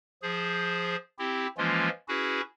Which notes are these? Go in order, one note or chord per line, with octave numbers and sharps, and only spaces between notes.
F3 G#4 C5
C4 E4 G4
E3 F3 G#3 A#3 C#4 F4
C#4 E4 F#4 G#4 B4